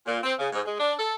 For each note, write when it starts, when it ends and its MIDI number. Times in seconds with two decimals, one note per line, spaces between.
0.06 0.19 46
0.23 0.33 60
0.39 0.48 49
0.53 0.61 44
0.65 0.75 56
0.79 0.94 62
0.99 1.15 69